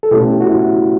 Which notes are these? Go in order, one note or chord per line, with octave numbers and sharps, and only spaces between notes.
A4
B2 A3 C#4 E4 G4
F#4
E4